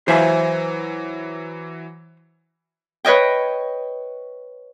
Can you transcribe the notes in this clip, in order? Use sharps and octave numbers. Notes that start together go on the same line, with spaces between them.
E3 F#3 C5 E5 G#5
B4 C#5 D#5 G5